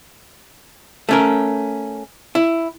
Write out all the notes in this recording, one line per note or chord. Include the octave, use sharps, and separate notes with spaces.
A3 C#4 A#4
E4